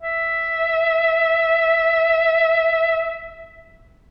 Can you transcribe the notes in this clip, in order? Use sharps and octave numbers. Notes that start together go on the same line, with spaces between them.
E5